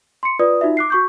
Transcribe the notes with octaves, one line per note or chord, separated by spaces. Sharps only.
C6 C#7
F4 B4 D5 D#6
D#4 F4 F#4 E5
D6 F#6 C7
F#4 C#6 G6